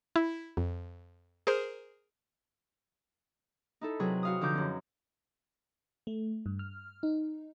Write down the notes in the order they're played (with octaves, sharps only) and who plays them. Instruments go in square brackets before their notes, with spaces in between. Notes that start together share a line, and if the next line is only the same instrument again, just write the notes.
[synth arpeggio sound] E4
F2
G#4 A#4 C5
[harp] D#4 E4 A4
C3 F#3 G#4 B4
F#4 F5 D#6
D3 F3 D#4 D6 G6
F#2 C#4
[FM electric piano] A3
G2
F6
D#4